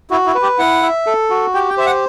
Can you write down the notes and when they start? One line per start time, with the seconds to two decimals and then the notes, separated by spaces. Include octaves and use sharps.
0.11 E4 F#4
0.27 E4
0.35 B4
0.42 G4
0.59 E4 F#5
0.82 E5
1.06 A4
1.30 F#4
1.54 G4 G5
1.70 G5
1.77 C5 E5
1.86 F#5